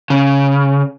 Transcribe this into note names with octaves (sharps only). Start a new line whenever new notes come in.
C#3